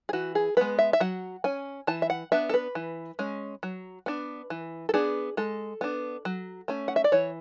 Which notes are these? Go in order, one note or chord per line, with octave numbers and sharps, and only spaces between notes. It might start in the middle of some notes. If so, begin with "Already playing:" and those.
G#4
E3 F#4
G#4
G#3 B3 B4
E5
E5
F#3 F#5
C#4 G#5
E3 A5
E5
F#5
B3 D4 E5
A4
B4
E3
G#3 C#4
F#3
B3 D4
E3
A4
B3 D4 G#4
G#3 A4
B3 D4
F#3
A3 C#4
F#5
E5
D5
E3 C#5